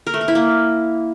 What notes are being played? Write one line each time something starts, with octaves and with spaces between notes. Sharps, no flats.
A#4
A3
A#4
E4
A#3